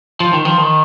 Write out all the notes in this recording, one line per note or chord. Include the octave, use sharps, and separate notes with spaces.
F3
D#3
F3
D#3